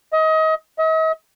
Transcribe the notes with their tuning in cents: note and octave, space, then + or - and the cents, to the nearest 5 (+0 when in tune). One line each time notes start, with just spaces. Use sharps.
D#5 +30
D#5 +45